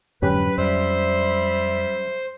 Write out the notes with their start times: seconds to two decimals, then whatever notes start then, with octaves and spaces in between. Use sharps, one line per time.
0.22 F2 G#2 D3 F#3 C#4 G4 B4
0.58 F2 G3 C5 E5